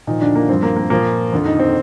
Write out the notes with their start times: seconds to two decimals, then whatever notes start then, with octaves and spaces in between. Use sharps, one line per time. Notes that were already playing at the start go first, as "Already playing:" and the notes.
0.07 A#2 D#3 F3 D#4
0.22 D3 D4
0.35 A#3
0.49 G2 F3 C4
0.63 A#3
0.77 A#3
0.90 A#2 F3 A#3
1.32 F2 D3 F3
1.45 D#3 D#4
1.60 C4